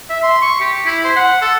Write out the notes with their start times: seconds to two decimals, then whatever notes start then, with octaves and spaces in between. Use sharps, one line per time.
0.10 E5
0.23 C6
0.42 C#6
0.60 G4
0.86 E4
1.04 C5
1.16 F#5
1.42 A4